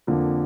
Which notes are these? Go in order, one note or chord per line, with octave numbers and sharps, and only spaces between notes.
F2 D3 F3 A#3